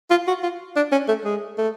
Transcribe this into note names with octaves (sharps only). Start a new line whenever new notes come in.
F4
F#4
F4
D4
C#4
A3
G#3
A3